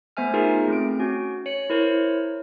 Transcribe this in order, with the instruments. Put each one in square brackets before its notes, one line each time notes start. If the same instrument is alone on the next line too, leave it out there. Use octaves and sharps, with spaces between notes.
[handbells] A3 B3 C5 E5 G#5 F6
D#4 F4 G#4 A#4
A3 C4 D7
C#4 F#4
C#5 C#7
E4 A#4 C5 C#5